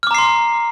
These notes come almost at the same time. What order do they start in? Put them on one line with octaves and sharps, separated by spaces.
F6 D6 A#5 C7 C6